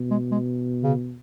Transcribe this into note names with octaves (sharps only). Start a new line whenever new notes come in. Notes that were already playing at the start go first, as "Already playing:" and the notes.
Already playing: B2
G#3
G#3
C#3